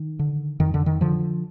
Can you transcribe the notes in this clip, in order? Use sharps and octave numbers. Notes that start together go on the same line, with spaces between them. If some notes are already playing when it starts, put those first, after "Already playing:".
Already playing: D#3
D3
F2 D#3
D3
D#3
D3 F3